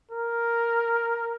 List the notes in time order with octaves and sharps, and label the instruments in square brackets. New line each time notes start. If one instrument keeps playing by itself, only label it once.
[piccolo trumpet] A#4